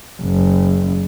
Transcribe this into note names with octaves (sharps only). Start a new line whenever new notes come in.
F#1